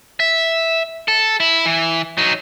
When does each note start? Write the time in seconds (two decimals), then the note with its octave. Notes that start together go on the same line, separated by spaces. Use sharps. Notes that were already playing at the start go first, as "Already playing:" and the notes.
0.20 E5
1.08 A4
1.40 E4
1.66 E3
2.18 F#3 D#4